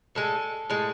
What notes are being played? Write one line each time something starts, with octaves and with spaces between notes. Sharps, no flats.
A2 G#3 A4
A2 G#3